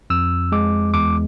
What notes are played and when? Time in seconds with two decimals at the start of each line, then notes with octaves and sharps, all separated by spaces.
0.10 F2 E6
0.52 G#3 D6
0.94 E2 D6